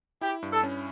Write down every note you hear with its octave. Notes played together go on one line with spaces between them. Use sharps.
E4 G4
G2
A4
C#4